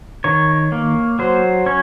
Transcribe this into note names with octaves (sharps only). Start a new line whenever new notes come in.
D#3 C#5
A#3
F#3 C5
C#4 C#5